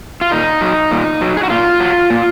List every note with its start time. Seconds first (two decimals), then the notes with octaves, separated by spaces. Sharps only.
0.21 F4
0.31 A#2 D#4
0.61 F#3
0.91 A#2
1.21 F#3
1.37 G#4
1.43 F#4
1.50 A#2 F4
1.80 F#3
2.10 A#2